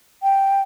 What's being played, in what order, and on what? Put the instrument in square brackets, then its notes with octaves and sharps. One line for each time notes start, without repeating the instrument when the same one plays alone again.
[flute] G5